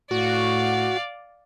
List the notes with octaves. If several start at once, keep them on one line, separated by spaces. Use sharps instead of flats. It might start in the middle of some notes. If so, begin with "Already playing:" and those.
A2 F#4 D5 F5